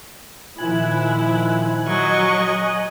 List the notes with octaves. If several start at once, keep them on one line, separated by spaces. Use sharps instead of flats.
A#2 D#3 F3 E4 G#5 F#6
F#3 D#5 C#6